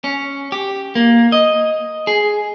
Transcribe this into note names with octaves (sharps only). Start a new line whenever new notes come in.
C#4
G4
A#3
D#5
G#4